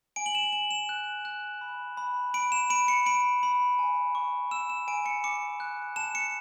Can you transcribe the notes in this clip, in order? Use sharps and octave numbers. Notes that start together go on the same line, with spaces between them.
G#5 D7
F#7
E7
G#5 F#7
E7
F#6
F#6
B5
B5
B5 D7
E7
B5 D7
C#7
B5 D7
B5
G#5
C#6
E6 E7
E7
G#5 D7
C#7
D6 C#7
F#6
A5 E7
C#7